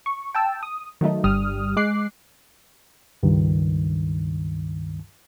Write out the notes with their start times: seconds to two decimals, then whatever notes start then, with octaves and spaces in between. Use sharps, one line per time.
0.06 C#6
0.35 G5 A5 E6
0.63 D#6
1.01 D#3 F#3 A3 D#4
1.24 G1 G2 G3 D#6 F6
1.77 G#3 D6 F#6 C7
3.23 C#2 G2 D#3